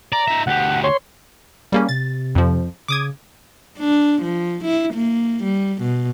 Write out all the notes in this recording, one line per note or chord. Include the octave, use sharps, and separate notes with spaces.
D5 A#5
D#4 E5
D2 G4 F#5
C#5 C6
G3 A#3 C#4 G#4
C3 A6
F2 F3
C#3 D6 D#6 G#6
D4
F3
E4
A#3
G3
B2